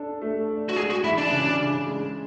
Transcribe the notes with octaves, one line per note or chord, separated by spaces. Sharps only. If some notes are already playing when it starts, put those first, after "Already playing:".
Already playing: D4 A4
A3
D5
F#4
G#3 G#4
F#4
E3 E4
D4
C#3
C#3
G#3